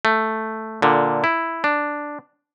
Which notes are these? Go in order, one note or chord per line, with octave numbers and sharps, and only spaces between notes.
A3
A#2 D3
E4
D4